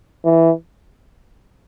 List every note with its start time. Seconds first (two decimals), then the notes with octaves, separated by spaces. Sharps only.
0.25 E3